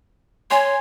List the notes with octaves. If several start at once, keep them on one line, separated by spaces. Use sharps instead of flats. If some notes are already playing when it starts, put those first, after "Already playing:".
C#5 G#5 C6